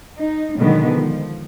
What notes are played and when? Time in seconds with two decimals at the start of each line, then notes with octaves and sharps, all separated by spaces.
0.17 D#4
0.57 B2 D3 D#3 F#3 G#3 B3
0.88 F3